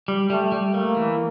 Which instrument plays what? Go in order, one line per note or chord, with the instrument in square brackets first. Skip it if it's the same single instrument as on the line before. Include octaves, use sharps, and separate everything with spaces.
[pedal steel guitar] G3
[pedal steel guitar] G3 [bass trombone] A3
[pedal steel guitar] G3
[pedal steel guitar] A3 [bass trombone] A#3
[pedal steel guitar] E3